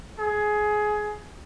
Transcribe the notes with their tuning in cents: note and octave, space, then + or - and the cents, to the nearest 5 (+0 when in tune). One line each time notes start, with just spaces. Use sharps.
G#4 +20